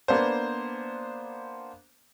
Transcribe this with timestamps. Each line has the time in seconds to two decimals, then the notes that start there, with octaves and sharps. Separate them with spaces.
0.08 A#3 B3 D4 C5